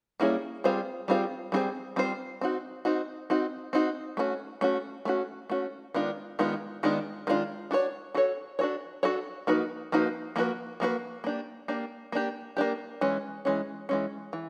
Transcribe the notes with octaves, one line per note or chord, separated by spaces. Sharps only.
G3 A#3 C#4 E4 G#4
G3 C4 F4 G#4 C5
G3 C4 F4 G#4 C5
G3 C4 F4 G#4 C5
G3 C4 F4 G#4 C5
C4 D#4 F#4
C4 D#4 F#4
C4 D#4 F#4
C4 D#4 F#4
A3 C#4 F#4
A3 C#4 F#4
A3 C#4 F#4
A3 C#4 F#4
D#3 G#3 B3 D4 F4
D#3 G#3 B3 D4 F4
D#3 G#3 B3 D4 F4
D#3 G#3 B3 D4 F4
D4 F#4 A4 C#5
D4 F#4 A4 C#5
D4 F#4 A4 C#5
D4 F#4 A4 C#5
F3 A#3 D#4 F#4 B4
F3 A#3 D#4 F#4 B4
F3 A#3 D#4 F#4 B4
F3 A#3 D#4 F#4 B4
A#3 D4 G4
A#3 D4 G4
A#3 D4 G4
A#3 D4 G4
E3 G#3 C#4
E3 G#3 C#4
E3 G#3 C#4
E3